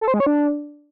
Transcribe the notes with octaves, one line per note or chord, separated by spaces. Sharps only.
A4
C5
G#3
C#5
D4